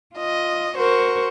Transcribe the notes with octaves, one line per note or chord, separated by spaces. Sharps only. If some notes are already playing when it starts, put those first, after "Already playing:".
F4 D#5
F#4 A#4 C5 C#6